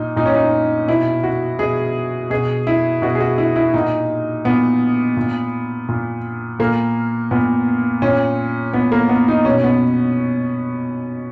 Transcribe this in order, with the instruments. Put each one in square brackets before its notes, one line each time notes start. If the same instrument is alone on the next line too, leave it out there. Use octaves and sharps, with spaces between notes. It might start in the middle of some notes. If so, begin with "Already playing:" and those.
Already playing: [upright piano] A#2 D#4
A#2 D#4
C#4
D#4
B2 E4
F#4
B2 G#4
B2 G#4
E4
B2 F#4
G#4
F#4
E4
E4
A#2 D#4
A#2 B3
A#2
A#2
A#2 A#3
A#2 B3
A#2 C#4
A#2 B3
A#3
B3
D#4
B2 C#4
B3